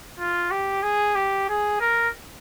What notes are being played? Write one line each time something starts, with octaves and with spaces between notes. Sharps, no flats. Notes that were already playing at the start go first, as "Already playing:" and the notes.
F4
G4
G#4
G4
G#4
A#4